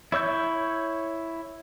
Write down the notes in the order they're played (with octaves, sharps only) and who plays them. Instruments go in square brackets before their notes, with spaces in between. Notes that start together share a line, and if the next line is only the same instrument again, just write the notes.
[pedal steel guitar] E4 C#5 E6 G6